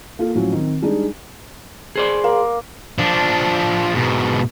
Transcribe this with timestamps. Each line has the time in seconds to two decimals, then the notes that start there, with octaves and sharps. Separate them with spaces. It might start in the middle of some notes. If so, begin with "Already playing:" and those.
0.19 A#3 F4 A4
0.35 A2 F3 F#3 C#4 F4
0.52 D#3 C4
0.82 G3 G#3 D4 D#4 G#4
1.96 G#4 C5 D5
2.24 A#3
2.99 F3 D4
3.94 G#2 B2